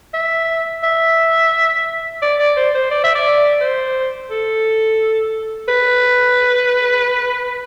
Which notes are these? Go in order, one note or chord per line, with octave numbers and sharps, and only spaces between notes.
E5
E5
D5
D5
C5
C5
D5
E5
D5
C5
A4
B4